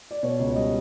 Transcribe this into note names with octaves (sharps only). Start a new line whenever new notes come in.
D5
B2 C#5
C#2
G3 D#5